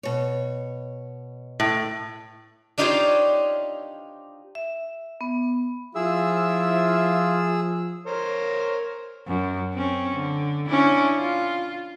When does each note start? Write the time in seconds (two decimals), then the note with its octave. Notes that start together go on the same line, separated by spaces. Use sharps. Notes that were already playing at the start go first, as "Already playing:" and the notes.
0.03 B2 C#5
1.60 A2
2.78 D4 D#4 F4 G4 C5 C#5
4.55 E5
5.21 B3
5.95 F3 E4 F4 G#4 E6
8.06 A#4 C5 C#5
9.27 F#2
9.74 C4 C#4
10.16 D3
10.68 C#4 D4 E4
11.18 F4